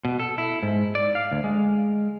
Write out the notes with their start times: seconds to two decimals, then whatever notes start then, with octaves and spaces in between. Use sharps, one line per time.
0.05 B2
0.20 A4
0.38 E4
0.63 G#2
0.95 D5
1.15 F5
1.32 D2
1.44 G#3